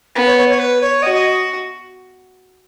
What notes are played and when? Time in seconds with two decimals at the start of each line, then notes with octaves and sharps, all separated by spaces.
0.15 B3
0.26 C#5
0.37 C#5
0.49 C#5
0.59 B4
0.81 C#5
1.02 F#4 D#5
1.14 D#5